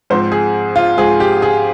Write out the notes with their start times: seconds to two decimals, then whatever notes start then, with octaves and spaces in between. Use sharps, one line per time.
0.10 G#2 F3 C4 C5
0.32 G#4
0.76 F4
0.97 G#2 F3 C4 G#4
1.20 G4
1.42 G#4